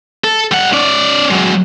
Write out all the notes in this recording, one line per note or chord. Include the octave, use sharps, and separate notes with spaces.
A4
G3 F#5
C#4 D5
F#3 G#3